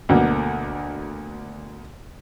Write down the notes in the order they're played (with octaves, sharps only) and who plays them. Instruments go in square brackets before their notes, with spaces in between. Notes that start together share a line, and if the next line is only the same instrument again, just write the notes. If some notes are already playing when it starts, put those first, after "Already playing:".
[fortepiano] D2 B2 D3 A#3